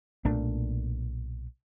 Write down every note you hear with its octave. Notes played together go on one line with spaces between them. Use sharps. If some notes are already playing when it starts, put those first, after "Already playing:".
B1 A#2 A3 D4